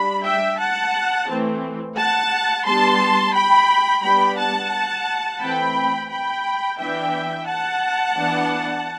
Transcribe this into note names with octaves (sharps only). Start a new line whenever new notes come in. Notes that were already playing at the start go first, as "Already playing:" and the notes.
Already playing: G3 D4 B5
E5 G5
F#5 A5
E3 A3 C4
F#5 A5
G3 B3 D4 A5 C6
G5 B5
G3 B3 D4 G5 B5
F#5 A5
E3 A3 C4 G5 B5
G5 B5
E3 B3 D4 E5 G5
F#5 A5
E3 B3 D4